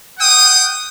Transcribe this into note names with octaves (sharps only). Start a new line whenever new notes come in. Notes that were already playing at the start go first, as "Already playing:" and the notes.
F#5 G5 D#6